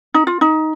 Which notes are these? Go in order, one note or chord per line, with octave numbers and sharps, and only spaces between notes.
D#4
F4
D#4